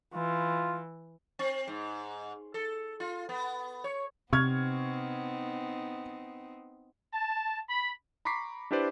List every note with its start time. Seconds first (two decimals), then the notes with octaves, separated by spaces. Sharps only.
0.14 E3 F4
1.39 C4
1.68 G#2
2.54 A4
3.00 F4
3.29 B3
3.84 C#5
4.33 C3 B3 C4 D#4 C#6 F6 G#6
7.13 A5
7.69 B5
8.25 A#5 B5 C#6 D6 B6 C7
8.71 D4 E4 G4 B4 C5 D5